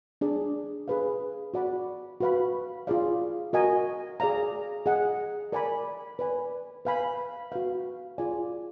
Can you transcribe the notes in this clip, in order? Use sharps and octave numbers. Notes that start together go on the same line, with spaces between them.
D4 G#4 D5
G#4 B4 F5
F#4 D5 F#5 B5
F#4 B4 F5 B5
F4 G#4 D5 F5
F#4 A#4 D#5 G#5
G#4 D5 F5 A#5
G#4 D#5 F#5
A#4 D5 G#5 B5
B4 D5 G#5
B4 F5 G#5 B5
F#4 B4 F5
F4 G#4 D5 G#5